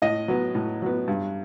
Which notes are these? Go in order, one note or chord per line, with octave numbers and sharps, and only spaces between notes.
A2 D#5
F#3 B3
A2
F#3 B3
G2